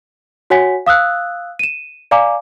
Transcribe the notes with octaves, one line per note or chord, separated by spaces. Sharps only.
F#4 C#5 F#5 G#5 B6
F5 D#6 E6 F#6
D#7 E7
D5 F5 G#5 A#5 D6